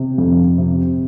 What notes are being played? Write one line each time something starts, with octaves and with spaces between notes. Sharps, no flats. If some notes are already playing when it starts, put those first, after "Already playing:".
Already playing: C3
F2
C3